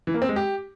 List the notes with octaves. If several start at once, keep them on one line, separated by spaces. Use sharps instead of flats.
E3
A#3
C4
G#3
G4